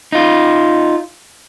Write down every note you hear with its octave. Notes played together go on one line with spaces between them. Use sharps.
D#4 F4